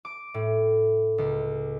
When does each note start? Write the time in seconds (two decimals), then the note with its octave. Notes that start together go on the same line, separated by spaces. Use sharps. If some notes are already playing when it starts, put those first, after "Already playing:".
0.05 D6
0.34 A2
1.18 C#2